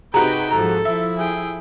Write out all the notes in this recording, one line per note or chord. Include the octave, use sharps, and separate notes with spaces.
C3 D#4 F#4 G#4 B4 G5 A#5
G#2 F3 A4 A#5
F3 E4 E5
G#4 G5